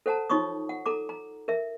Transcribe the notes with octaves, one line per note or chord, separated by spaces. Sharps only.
A4 C5 F#5 A5 A#5
D#4 F4 C#5 C6 C#6 D#6
F#5
A4 A#5 D6
A#5
A#4 E5